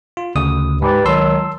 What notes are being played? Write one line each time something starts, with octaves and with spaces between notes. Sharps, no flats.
F4
D2 C#3 D#6
G#2 G4 B4 D5
C#2 D#3 F#3 A5 C6 E6